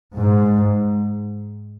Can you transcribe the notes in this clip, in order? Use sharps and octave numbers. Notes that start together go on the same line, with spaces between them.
G#2